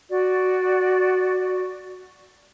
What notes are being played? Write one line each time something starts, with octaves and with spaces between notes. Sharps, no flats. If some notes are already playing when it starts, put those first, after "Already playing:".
F#4 D5